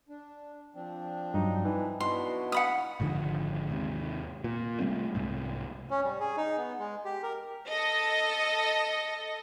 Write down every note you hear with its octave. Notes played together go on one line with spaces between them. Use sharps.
D4
F3 C4 D4
G2 F#3 D#4
E3 D#4
B2 D4 E4 F#4 C6
F#5 B5 D#6
G#1 G#2 D3 F3
D#2 G#2 C3
A#2
C3 G3 A3 C4
C2 G#2 C3
C#4
G3
G#4
D#4
B3
G#3
G4
A#4
A4 D#5